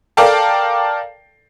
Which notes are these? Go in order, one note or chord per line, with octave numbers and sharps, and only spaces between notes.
A4 A#4 D5 F5 G5 A5